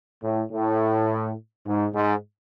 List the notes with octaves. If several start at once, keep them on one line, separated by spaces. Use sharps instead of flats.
A2
A2
G#2
G#2